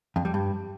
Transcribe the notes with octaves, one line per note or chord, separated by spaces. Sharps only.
F2
G3
G2